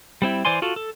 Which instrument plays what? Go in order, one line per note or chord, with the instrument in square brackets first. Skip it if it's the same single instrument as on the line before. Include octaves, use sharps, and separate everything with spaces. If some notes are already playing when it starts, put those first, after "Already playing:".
[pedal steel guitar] G3 C4 E4
E3 C5 D5 G#5 C6
F4 F#4 A4
A4